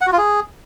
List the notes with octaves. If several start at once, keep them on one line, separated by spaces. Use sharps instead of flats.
F#5
F#4
F4
G#4